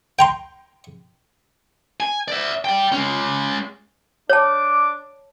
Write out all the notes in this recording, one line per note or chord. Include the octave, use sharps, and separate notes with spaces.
G5 A#5 C6
G#5
D5 E5
D5 G5
G#3 C#4
D4 C#5 A5 D6